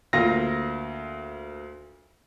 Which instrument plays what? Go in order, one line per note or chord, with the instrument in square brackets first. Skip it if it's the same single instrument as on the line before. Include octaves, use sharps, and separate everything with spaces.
[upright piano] D2 A#3 F4 A#6